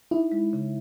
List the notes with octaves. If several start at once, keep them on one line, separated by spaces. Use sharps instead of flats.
D#4 E4
G#3
C#3